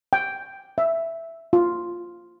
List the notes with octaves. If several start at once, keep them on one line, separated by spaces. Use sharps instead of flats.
G5
E5
F4